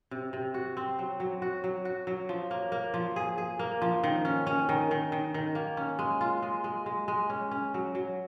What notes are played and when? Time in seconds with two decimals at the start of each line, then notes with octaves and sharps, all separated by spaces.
0.11 C3
0.33 C3
0.54 F#4
0.77 C4
0.99 F#3
1.20 F#3
1.42 F#4
1.64 F#3
1.85 F#4
2.07 F#3
2.29 F3
2.51 A#3
2.72 A#3
2.94 F3
3.16 G#4
3.38 G#4
3.59 A#3
3.82 F3
4.04 D#3
4.25 C#4
4.47 C#4
4.69 D#3
4.91 D#3
5.12 D#3
5.34 D#3
5.55 A#3
5.77 C#4
5.99 G#3
6.21 F4
6.42 G#3
6.64 G#3
6.86 G#3
7.08 G#3
7.30 C#4
7.51 C#4
7.74 F#3
7.95 F#3